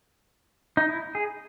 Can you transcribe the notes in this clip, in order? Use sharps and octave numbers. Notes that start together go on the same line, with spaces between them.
D#4
E4
G#4